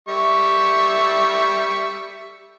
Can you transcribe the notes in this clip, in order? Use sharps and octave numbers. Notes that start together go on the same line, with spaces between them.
G3 E5 C#6